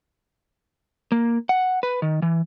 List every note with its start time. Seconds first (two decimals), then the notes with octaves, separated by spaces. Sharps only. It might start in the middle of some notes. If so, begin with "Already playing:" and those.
1.12 A#3
1.49 F#5
1.83 B4
2.02 D#3
2.22 E3